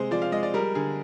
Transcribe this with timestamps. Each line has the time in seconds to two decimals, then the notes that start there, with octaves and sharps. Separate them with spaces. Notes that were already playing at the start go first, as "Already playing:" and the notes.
Already playing: C3 G#3 G#4 C5
0.11 F3 D5
0.22 F5
0.32 G#3 D#5
0.43 D5
0.54 G3 A#4
0.75 D3 G#4